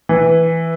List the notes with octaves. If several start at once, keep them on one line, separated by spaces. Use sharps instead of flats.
E3